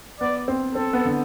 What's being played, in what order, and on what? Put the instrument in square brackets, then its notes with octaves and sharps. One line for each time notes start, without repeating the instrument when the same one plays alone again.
[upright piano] B3 [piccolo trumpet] D5
[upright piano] C4
[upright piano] C4 [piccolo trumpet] A4
[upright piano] B3
D3